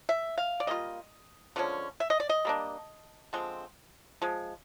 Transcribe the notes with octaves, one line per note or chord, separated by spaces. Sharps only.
E5
F5
D5
G3 A#3 F4 D#5
D3 F3 G#3 C#4
E5
D#5
D5
D#5
G3 A#3 D4
D3 F3 G#3 C4
F3 G#3